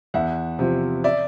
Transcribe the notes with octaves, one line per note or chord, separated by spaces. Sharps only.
E2 E5 F#5
C3 F3
D5 E5